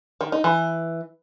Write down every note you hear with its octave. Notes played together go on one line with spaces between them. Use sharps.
D#3
D#4
E3